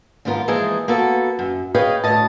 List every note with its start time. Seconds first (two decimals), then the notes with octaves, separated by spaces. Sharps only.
0.25 D#2 G#2 B3 F4 F#4 A#4
0.48 E3 F3 G#3 A#3 G#4
0.88 A#3 B3 F#4 A4
1.39 F#2
1.75 G#4 B4 C#5 D#5 F5 G5
2.04 D2 A2 C#5 D#5 A5